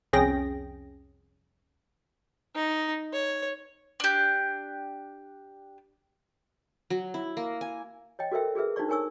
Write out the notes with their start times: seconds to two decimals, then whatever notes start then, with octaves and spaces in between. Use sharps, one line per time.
0.13 C2 F2 C#4 G#4 G5 A#6
2.55 D#4
3.13 C#5
4.00 D4 G4
6.90 F#3
7.14 E4
7.37 A#3
7.61 G#5
8.19 C#5 D#5 G5
8.32 F#4 A4 A#4 C5 E5 G5
8.55 F#4 G#4 A#4 B4 E5
8.76 D4 D#4 F#4 C5 D5 C#6
8.89 A#4 C#5 G#5 C#6 E6